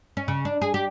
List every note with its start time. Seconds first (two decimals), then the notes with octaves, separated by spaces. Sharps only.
0.17 C#4
0.28 C#3
0.45 D4
0.62 G#4
0.74 G4